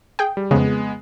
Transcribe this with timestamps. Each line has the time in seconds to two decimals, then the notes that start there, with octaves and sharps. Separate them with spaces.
0.19 G#4 G5
0.37 G3
0.51 F2 C#3 G#3 B3